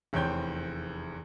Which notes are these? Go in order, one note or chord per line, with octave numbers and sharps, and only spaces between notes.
F1 E2 C4 C#5 G5 G6